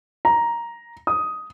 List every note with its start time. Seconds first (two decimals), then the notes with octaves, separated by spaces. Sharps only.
0.25 A#5
1.07 D#6